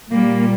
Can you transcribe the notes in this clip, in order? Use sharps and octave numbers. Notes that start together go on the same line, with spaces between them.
A#2 G3 A#3